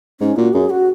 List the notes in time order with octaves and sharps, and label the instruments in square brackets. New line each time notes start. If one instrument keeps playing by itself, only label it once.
[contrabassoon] G#2 [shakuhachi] C#4
[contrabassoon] A#2 [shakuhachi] F#4
[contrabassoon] F#2 [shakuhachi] G#4
[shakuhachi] F#4